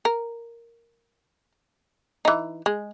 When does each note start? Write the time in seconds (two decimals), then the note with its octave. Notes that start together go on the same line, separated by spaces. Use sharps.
0.05 A#4
2.25 E3 D#4
2.66 G#3